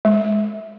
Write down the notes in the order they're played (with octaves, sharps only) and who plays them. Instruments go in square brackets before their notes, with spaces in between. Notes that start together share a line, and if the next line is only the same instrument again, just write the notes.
[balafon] G#3